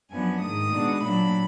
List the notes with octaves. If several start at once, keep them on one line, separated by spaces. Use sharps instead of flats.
F#2 F3 B3 D4 G#5
G#2 D#3 A#3 D#6
B2 G#3 D4
A#2 F#3 A#3 D4 B5